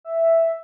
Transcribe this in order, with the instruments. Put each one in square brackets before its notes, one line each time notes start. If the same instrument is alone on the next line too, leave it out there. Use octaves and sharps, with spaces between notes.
[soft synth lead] E5